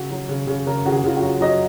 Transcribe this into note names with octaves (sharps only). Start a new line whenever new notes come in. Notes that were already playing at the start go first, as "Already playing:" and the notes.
Already playing: C#3 F#4
F#3
C#3
C#3
C#3 A#4
C#3 F#4
G#4
C#3 F4
F#4
F#3
F#3 D#5